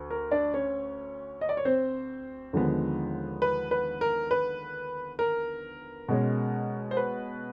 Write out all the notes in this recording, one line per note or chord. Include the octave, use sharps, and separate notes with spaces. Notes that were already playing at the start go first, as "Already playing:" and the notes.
Already playing: D2
A#4
D4 D5
C#4 C#5
D#5
D5
C#5
C4 C5
D#2 D3 F3 G#3 B3
B4
B4
A#4
B4
A#4
B2 G#3 C#4
C5
B4